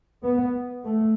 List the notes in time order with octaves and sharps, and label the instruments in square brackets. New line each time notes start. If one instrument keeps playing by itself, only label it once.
[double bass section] B3
A3